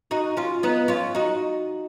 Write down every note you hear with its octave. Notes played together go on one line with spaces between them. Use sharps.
D#4 F#4
C#4 F4
B3 D#4
C#4 F4
D#4 F#4